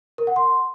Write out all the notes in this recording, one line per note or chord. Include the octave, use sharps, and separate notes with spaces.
A#4
F#5
C6